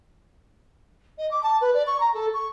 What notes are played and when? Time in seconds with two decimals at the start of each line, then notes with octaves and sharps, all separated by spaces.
1.18 D#5
1.31 D6
1.43 A5
1.61 B4
1.74 D5
1.87 C#6
2.00 A#5
2.14 A4
2.34 C#6